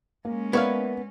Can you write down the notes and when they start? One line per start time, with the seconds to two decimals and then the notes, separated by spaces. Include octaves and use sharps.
0.25 G#3 A#3 C#4
0.53 A#3 B3 E4 A#4 C#5 D5 F5